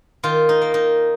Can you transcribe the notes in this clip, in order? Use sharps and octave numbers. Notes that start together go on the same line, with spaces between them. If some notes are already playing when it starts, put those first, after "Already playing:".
D#3 F4
D#4
A#3
D#4